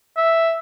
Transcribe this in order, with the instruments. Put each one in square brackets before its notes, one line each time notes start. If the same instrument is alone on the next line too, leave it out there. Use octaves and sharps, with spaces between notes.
[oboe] E5